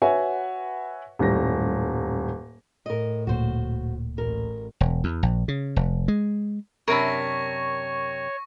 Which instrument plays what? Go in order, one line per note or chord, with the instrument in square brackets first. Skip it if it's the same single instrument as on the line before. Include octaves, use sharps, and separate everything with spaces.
[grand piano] F#4 B4 C#5 E5 F#5 G#5
D#1 F#2 A2 G3 A#6
[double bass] A2 [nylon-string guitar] A#4 D#5
[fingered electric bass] D1 A#2 [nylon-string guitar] F#4 C5
[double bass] A1 [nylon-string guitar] A#4
[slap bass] E1
E2
A#1
C#3
F1
G#3
[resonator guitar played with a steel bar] F#2 C3 D4 [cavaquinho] A#4 B5 [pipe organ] C#5 [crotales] C#6 A#6